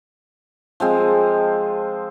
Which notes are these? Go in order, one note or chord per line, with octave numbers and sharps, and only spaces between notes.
F3 G#3 C4